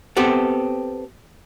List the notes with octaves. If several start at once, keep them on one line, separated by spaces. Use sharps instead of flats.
B3 C4 G4 A4